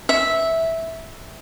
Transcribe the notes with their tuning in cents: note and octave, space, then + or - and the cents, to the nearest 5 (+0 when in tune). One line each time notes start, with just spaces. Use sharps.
E5 -10